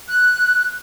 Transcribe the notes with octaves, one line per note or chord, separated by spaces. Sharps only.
F#6